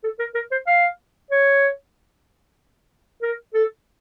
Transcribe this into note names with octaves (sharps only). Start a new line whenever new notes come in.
A4
A#4
A#4
C5
F5
C#5
A#4
A4